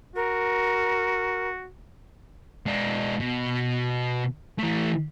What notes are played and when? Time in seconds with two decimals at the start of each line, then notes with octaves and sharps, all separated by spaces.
0.16 F#4 A#4
2.66 G#3 D4
3.20 B2
4.58 E3 A3